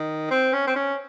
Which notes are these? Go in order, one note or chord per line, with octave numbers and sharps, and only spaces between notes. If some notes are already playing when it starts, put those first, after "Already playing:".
Already playing: D#3
C4
C#4
C4
C#4